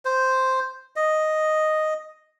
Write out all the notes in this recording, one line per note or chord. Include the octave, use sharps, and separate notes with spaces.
C5
D#5